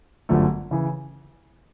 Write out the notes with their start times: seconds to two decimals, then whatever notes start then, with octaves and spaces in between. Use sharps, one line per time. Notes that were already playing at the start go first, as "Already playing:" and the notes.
0.29 G1 F#2 D3 F3 A3
0.71 C#3 E3